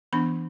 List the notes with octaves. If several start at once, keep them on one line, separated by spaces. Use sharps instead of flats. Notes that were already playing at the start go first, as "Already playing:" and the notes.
E3 B3 D4 B5